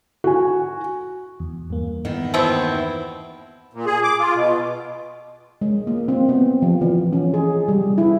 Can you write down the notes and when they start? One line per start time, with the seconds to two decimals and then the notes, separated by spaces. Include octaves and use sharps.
0.24 F#4 G#5
1.40 E2
1.70 G2 A#3
2.05 E2 D#3 B3
2.34 B2 C4 E4
3.73 A#2
3.86 G#4
4.03 D6
4.19 F4
4.34 B2
5.61 G#3
5.87 A#3
6.08 C4
6.29 B3
6.62 F3
6.81 E3
7.13 C#4
7.34 G#4
7.68 G3
7.98 E4